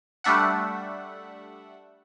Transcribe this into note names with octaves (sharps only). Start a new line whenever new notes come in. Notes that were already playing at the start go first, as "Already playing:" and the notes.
G3 A3 D4 E5 F#5